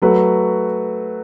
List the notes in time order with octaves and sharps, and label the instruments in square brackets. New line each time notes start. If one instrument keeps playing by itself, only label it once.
[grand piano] F#3 A3 F#4 B4